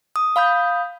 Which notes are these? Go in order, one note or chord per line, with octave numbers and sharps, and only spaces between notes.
D#6
F5 B5 D#6 G6